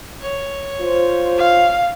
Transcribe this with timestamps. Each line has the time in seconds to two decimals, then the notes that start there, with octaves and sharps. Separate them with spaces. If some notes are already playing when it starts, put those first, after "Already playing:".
0.21 C#5
0.80 F4 C5
1.38 F5